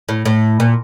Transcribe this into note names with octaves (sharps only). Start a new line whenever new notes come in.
A2
A2
A#2